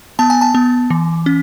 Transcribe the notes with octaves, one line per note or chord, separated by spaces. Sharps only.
B3 A5
G#5
A5
B3
E3
C#4